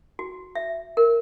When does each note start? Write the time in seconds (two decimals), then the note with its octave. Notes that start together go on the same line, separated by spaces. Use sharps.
0.19 F#4
0.55 E5
0.97 A#4